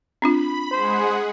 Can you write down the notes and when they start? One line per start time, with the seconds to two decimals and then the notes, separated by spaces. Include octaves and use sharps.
0.22 C4 D4 F4 B5
0.72 G#3 G#4 C5 F#5